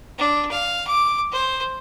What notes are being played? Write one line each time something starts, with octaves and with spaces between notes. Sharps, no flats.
D4
F5
D6
C5